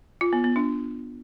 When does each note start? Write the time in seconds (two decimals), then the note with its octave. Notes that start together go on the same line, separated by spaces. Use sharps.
0.21 F4
0.33 B3
0.44 B3
0.56 D4